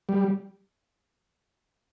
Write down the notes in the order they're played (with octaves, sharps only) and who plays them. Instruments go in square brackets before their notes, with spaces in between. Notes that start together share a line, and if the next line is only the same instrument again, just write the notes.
[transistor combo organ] G3